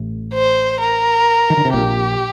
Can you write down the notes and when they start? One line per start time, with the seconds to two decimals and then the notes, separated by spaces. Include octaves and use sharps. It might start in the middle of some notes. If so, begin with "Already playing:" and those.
Already playing: A1 A2
0.34 C5
0.80 A#4
1.50 D#3
1.57 D3
1.65 C3
1.73 A#1 A#2 G4